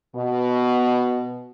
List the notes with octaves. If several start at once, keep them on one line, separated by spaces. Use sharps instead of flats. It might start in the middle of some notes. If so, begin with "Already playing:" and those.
B2